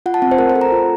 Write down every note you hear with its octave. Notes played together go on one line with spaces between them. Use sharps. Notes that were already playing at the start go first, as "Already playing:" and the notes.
F4 F#5
A5
C4 F#5
C5
A3 A#4
C5
A4
A#5
F4